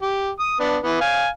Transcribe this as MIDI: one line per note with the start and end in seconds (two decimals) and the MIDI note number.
0.02 0.29 67
0.40 0.57 87
0.60 0.77 59
0.60 0.77 62
0.83 1.00 52
0.83 1.00 59
1.01 1.28 77
1.01 1.28 80